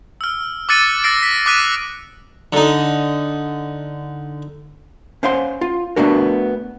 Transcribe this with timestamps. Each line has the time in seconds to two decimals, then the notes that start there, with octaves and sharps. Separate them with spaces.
0.21 E6 F6
0.69 D6 E6 F#6 A6 C#7 D#7
1.04 E6 A6 A#6 C7 D7
1.23 B6
1.46 D6 D#6 F#6 B6 D#7
2.53 D3 D#4
5.23 C#4 C5 F5 F#5 C6
5.61 F4
5.96 A3 B3 C#4 D4 F#4 A#4